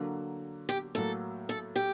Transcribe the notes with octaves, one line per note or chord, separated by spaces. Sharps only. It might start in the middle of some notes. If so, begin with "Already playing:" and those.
Already playing: D3 F#3 A#3
G4
A2 F#3 A#3 A4
A4
G4